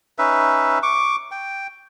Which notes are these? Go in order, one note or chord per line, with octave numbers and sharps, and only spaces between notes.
C#4 D#4 B4 E5
C#6 D6
G5